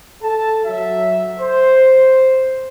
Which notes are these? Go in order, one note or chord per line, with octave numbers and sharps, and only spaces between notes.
A4 A5
F#3 E5
C5